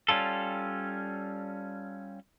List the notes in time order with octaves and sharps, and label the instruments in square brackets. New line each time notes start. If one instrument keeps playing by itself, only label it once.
[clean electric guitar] G3 C#4 F4 A4